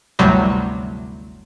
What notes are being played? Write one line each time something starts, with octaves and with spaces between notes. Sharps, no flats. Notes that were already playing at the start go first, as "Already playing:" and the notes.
G1 D2 A2 C3 F#3 G3